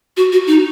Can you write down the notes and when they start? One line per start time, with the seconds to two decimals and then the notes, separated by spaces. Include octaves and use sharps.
0.17 F#4
0.32 F#4
0.47 D#4